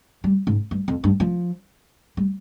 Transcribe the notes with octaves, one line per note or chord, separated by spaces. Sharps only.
G3
G#2
G2
F2
G2
F3
G3